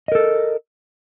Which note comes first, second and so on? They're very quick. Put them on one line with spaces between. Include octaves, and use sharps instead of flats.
D#5 A#4 A4